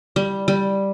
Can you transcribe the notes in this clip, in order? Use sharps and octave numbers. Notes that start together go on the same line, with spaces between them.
G3
G3